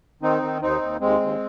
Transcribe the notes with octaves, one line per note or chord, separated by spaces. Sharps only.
D#3 C4 D#4
D#3
D#2 C4 D#4
D#2
D#2 G#3 C4
D#2